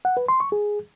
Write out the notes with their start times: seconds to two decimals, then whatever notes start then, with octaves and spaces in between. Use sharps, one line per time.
0.05 F#5
0.17 B4
0.28 C6
0.40 C#6
0.52 G#4